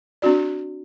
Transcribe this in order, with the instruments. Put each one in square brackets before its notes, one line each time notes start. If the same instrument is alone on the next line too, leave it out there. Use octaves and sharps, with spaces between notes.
[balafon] C4 D4 F#4 D5